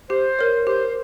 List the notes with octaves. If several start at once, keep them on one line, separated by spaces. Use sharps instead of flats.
G4 C5
A#4 C#5
G4 C5